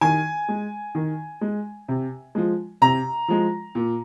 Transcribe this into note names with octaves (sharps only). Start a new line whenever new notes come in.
D#3 G#5
G#3
D#3
G#3
C3
F3 G#3
C3 A#5
F3 G#3
A#2